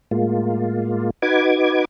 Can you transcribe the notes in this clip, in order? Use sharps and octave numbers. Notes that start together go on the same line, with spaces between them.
A2 G#3 A#3 F4
D#4 F#4 B4 D6 G#6